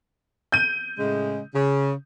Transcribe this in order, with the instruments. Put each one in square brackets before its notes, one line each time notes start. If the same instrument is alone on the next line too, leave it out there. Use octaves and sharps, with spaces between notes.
[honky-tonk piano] G6 D#7
[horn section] A2 C#3 G#3
C#3